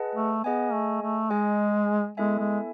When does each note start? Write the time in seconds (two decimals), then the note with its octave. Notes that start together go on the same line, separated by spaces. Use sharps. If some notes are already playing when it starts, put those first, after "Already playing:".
Already playing: G#4 B4 D#5 F#5 A5
0.15 A3
0.44 B3 G#4 D#5 G#5
0.73 A3
1.02 A3
1.31 G#3 G#4 D#5 G#5
2.17 G#3 B3 E4 A4 E5 G#5
2.39 G#3